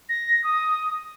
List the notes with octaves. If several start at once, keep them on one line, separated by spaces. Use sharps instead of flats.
A#6
D#6